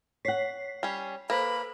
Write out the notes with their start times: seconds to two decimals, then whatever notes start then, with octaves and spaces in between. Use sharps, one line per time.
0.25 C#5 F#5 B6 C7
0.83 G3 C#4
1.30 A#3 A4 B4 C5 B5